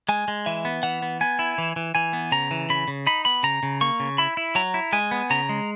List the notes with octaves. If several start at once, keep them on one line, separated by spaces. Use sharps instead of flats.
G#3 G#5
G#3
E3 E5
B3
E3 F#5
B3
B3 G#5
E4
E3
E3
E3 G#5
B3
C#3 A#5
E3
C#3 B5
C#3
D#4 B5
B3 B5
C#3 A#5
C#3
A#3 C#6
C#3
E4 B5
E4
F#3 A#5
E4
G#3 G#5
B3
C#3 A#5
G#3